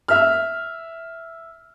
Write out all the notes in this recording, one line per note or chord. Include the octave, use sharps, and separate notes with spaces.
E5 F6